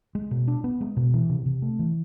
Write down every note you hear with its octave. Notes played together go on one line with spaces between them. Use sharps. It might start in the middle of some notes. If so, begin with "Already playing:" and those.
G#3
B2
D4
B3
G#3
B2
E3
C3
C3
A3
E3